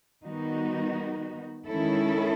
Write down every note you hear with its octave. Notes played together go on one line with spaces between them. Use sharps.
D#3 G3 B3 D#4 F#4
D#3 G#3 C#4 E4 A4